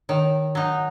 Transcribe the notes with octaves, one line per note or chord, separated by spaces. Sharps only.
D#3 C#5
F#3 D#4